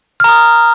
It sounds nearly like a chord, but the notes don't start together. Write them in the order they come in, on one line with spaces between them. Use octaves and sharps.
F6 A#5 D#6